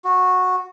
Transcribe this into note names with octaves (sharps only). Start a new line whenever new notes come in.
F#4